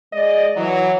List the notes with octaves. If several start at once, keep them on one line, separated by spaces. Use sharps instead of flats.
G#3 D5 D#5
E3 F#3